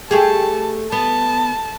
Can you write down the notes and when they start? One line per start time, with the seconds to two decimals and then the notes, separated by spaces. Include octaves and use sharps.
0.11 A3 G4 G#4 A5
0.92 B3 A5